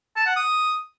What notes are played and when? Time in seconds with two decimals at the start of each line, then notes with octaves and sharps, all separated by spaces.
0.16 A5
0.26 F#5
0.36 D#6